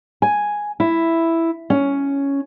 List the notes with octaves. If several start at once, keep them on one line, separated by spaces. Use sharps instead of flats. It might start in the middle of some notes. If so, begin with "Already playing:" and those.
G#5
E4
C#4